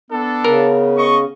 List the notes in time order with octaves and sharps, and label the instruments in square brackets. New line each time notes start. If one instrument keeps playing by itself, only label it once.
[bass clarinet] B3 [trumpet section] D4 A4
[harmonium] C#3 [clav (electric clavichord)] A#4
[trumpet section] D#5 C#6